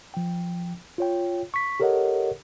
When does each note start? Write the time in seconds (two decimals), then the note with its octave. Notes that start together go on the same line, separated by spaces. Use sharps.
0.14 F3 G5
0.98 F4 C#5 G5
1.54 C#6 B6
1.80 G4 A4 A#4 C#5 D#5 F#5